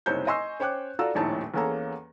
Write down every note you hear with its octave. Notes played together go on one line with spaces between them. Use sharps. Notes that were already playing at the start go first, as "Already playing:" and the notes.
F#1 C2 D#4 C5 C#5 G6
D#5 G#5 C6 C#6 E6 C7
C#4 C5 C#5 G5 D6 F#6
F4 F#4 A4 D5 A#5 E6
D#1 A#1 A2 D#4 C#5 A5
E2 A#3 C#4 G#4 A4 A#5